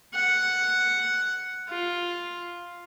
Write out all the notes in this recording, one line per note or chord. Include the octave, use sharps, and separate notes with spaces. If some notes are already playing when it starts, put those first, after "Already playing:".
F#5
F4